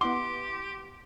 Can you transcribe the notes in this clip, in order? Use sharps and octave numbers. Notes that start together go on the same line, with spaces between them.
B3 E4 G4 F#5 C6 D6